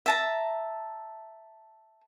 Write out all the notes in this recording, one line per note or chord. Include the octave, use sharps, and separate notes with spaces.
E5 A5 A#5